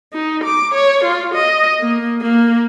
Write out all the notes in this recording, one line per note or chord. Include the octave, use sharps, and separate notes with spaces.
D#4
D6
C#5
F4
D#5
A#3
A#3